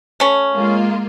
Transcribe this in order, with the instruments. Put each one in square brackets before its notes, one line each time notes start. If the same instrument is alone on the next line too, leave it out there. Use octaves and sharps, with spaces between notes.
[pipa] A3 C#4
[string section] G#3 A#3 F4